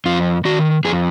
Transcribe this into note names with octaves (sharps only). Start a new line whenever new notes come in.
F2 F4
D#3 F#4
F2 G#4